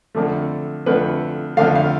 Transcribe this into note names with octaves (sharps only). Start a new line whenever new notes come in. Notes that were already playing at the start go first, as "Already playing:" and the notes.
F2 D3 A3
F2 D3 A3 B4
F2 D3 A3 F5
F5